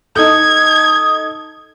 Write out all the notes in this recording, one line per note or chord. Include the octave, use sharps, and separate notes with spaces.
D#4 A4 D#6 G#6